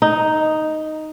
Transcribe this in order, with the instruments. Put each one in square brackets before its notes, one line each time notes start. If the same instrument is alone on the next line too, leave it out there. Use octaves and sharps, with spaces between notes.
[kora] D#4